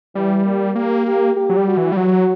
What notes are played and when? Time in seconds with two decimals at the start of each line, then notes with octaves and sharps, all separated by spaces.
0.15 E3 G3
0.45 A#3
0.75 A#3 G4
1.07 G4
1.36 G4
1.49 F#3
1.57 G3
1.67 F#4
1.77 E3
1.92 G3
1.97 F#3 F#4